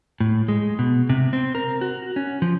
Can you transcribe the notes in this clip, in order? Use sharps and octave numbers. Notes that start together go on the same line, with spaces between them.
A2
G#3
B2
C3
C4
A#4
F#4
C#4
F3